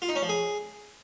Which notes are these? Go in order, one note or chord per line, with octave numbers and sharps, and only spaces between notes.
F4
D#4
C#4
F3
G#4